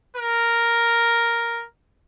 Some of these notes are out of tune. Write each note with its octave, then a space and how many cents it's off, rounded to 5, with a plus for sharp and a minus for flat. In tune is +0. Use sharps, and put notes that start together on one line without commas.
A#4 +0